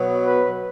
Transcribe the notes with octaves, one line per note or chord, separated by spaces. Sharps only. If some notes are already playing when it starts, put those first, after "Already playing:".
Already playing: B2 F#3 B3
B4